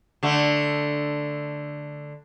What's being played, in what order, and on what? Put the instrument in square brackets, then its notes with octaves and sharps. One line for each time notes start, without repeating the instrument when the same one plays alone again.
[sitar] D3 A3